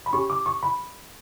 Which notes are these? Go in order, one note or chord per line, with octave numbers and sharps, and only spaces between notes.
B5
C#4 G4 C#6
D6
C#6
B5